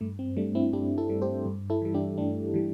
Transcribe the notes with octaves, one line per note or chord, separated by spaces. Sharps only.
G2 A3
C4
G3 A3 D4
C4 E4
G2 D4 G4
E4 A4
G3
G4 C5
G2
E4 A4
E3 G3
D4 G4
G2 A3 D4
E3 G3